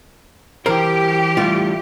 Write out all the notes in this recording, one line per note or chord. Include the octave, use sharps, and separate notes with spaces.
E3 E4 G4 A#4 C5
E3 G3 A3 F4